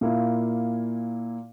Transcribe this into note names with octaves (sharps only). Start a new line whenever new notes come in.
A#2 A#3 E4